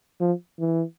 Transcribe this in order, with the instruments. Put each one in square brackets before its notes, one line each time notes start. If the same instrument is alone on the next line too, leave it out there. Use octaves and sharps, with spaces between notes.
[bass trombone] F3
E3